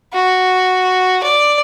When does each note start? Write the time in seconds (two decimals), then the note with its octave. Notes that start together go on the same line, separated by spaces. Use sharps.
0.13 F#4
1.23 D5